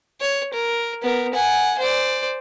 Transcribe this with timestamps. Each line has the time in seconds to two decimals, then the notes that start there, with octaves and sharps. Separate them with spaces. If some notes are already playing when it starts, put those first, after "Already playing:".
0.21 C#5
0.53 A#4
1.02 B3 A#4
1.34 F#5 G#5
1.79 C5 D5